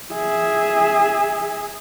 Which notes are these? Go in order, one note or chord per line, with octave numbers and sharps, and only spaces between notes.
G#4 E5